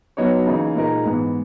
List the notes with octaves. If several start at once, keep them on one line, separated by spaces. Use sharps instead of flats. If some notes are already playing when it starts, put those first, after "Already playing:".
F#3 B3 D#4 F#4 C#5
C#3 E3 A#3 D#4
A#2 G#3 D#4 A#4
G#2 E3 B3